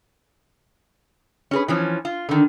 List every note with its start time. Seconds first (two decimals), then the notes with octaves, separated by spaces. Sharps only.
1.51 C#4 G#4 B4
1.68 E3 F3 C#4
2.05 F4
2.29 D3 D#3